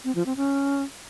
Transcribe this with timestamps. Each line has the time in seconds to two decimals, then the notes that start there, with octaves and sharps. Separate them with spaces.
0.05 C4
0.15 F3
0.26 C4
0.37 C#4